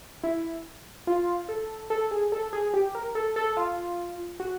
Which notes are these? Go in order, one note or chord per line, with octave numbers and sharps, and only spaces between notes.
E4
F4
A4
A4
G#4
A4
G#4
G4
A#4
A4
A4
F4
F#4